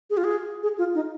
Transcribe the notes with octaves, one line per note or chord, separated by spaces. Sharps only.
G#4
F4
G#4
G#4
F4
D#4